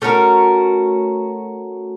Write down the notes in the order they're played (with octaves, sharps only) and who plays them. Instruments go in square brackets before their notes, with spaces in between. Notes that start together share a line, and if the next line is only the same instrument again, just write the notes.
[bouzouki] A3 C#4 F#4 A#4